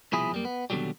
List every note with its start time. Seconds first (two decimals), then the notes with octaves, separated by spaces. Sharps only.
0.13 C2 B2 F3 E4 G#4 B5
0.32 F#2 G3 A#3
0.45 B3
0.70 D#2 B2 D3 E3 F#3 G3